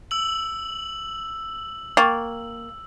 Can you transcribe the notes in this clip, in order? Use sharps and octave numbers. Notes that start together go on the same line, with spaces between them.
E6 F#7
A#3 G5 C#6 A6